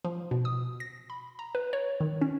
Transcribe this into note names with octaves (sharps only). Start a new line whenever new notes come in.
F3
B2
D#6
A#6
B5
A#5
B4
C#5
D#3
C#4